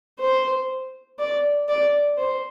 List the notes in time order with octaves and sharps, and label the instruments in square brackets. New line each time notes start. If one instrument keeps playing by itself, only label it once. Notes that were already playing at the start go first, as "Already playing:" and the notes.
[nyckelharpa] C5
D5
D5
C5